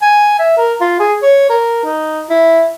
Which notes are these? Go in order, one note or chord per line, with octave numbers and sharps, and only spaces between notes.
G#5
E5
A#4
F4
G#4
C#5
A#4
D#4
E4